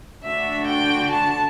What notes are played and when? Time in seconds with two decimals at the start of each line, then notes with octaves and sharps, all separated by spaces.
0.23 D3 A3 D4 F#4 E5
0.67 G5
1.11 A5